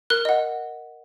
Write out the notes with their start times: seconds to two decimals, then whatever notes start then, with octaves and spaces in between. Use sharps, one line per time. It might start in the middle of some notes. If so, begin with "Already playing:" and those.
0.10 A#4 F#6
0.25 D#5 F#5